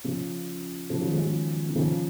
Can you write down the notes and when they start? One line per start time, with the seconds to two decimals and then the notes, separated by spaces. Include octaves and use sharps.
0.04 C#3 F3
0.90 C#3 F3
1.00 D#3 F#3
1.11 F3 G#3
1.22 F3 G#3
1.69 D#3
1.75 C#3 F3